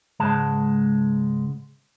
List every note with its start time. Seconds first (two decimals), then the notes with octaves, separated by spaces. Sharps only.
0.20 C#2 G#2 G#3 A5